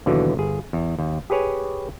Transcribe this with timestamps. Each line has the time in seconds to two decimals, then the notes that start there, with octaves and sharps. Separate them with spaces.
0.06 D#2 B2 D3 E3 F#3
0.37 G1 G#4
0.73 E2
0.99 D#2
1.30 G4 G#4 B4 C#5 G#5